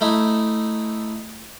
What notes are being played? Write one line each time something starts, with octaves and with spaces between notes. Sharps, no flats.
A3 D#4 E4